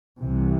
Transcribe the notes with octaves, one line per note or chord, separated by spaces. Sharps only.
C2 C3 E3